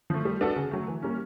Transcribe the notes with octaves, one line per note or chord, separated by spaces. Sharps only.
F3 A3
G3
B3 D4 F#4 A4
C#3
F#3 A3
E3
G3 A#3 C#4